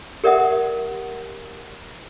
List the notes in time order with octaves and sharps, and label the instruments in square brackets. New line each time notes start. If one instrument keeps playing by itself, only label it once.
[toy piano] G4 A#4 D5 E5 F#5 D#6